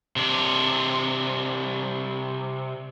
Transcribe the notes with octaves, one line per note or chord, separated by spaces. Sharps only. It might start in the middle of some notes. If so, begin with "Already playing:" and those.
C3 D4